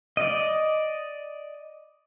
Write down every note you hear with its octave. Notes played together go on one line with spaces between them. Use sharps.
D5 D#5